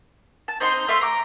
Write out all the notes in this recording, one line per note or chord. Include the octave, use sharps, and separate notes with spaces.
A5
C4 D#4 C5 C6
A3 E5 F5 C6
A#5 D6